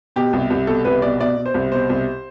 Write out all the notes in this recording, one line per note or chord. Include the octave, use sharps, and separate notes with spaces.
B2 G4
C2
C2
B2 A4
C2 B4
B2 D5
B2 D5
B2
C5
C2
B2 C5
C2